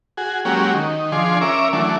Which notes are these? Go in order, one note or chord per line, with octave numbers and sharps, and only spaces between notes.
F#4 G#4
F#3 G#3 A#3 C#4 F#4 G4
D#3
F3 D4 G#4 C6
C#4 A#4 E5 D6
E3 F#3 A3 D4